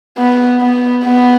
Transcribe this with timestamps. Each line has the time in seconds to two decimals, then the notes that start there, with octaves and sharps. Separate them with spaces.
0.18 B3
0.60 B3
1.04 B3